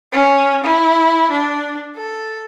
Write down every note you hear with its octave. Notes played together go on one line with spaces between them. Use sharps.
C#4
E4
D4
A4